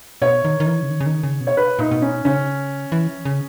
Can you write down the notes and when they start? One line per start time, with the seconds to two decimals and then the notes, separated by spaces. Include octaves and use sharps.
0.22 B2 C#5
0.45 D#3
0.60 D#3
0.66 E3
0.83 C#3
0.90 D#3
1.00 C#3
1.06 D#3
1.23 C#3
1.40 B2
1.47 C#5
1.57 B4
1.79 A#2 D#4
1.91 B2
2.02 C#4
2.25 C#3 C#4
2.92 E3
3.25 C#3